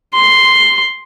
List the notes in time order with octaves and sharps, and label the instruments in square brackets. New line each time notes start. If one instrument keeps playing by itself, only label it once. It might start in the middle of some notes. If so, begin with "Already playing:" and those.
[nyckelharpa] C6